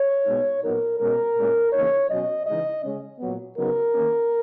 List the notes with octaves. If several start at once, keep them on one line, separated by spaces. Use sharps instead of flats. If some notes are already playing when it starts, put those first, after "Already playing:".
Already playing: C#5
B2 G#3 B3 D#4
A#2 F#3 B3 D#4 A#4
B2 G#3 C#4 A#4
A#2 G#3 C#4
C#3 E3 A#3 D#4 C#5
B2 F#3 C#4 D#5
C#3 E3 G#3 D#4 D#5
C#3 G#3 C#4
A#2 F#3 B3
C#3 F#3 B3 D#4 A#4
D#3 A#3 C#4